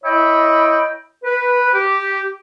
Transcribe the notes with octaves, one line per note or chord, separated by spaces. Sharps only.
E4 C#5 D#5 E5 G5 B5
B4
G4